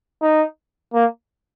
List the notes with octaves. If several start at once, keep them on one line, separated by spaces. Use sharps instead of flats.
D#4
A#3